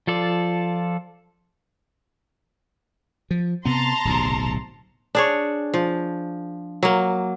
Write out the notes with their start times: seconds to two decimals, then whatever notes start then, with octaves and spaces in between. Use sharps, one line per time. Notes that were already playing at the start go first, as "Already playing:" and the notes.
0.07 F3 F4 A4 D5
3.31 F3
3.65 C3 B3 A5 A#5 C6
4.05 D1 B1 C3
5.15 D4 G#4 C#5
5.74 F3
6.83 F#3 A#3